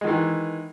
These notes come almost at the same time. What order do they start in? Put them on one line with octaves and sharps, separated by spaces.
G#3 D#3 E3